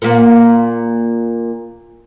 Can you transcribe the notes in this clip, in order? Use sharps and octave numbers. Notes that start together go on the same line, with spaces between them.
A#2 A#3